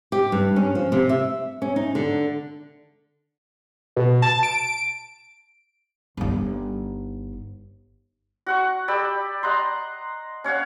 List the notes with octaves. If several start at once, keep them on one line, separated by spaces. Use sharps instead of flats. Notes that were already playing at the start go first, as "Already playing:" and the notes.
G4
G2
C#4
F3
C3
E5
C#4
D#4
D3
B2
A5
D7
G1 D#4
F#4 F#5 C#6
G4 D5 B5 E6
D#5 F#5 A#5 C6
C#4 C#5 F5 F#5